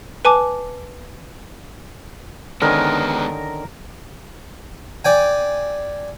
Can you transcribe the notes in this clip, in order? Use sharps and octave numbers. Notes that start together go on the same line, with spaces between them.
B4 G#5 A5 D6
D3 D#3 G#3 B3 C#4 A#4
D5 G5 G#5